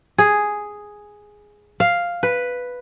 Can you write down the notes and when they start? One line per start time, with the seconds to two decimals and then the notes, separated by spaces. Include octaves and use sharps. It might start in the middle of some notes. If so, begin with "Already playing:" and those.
0.18 G#4
1.80 F5
2.23 B4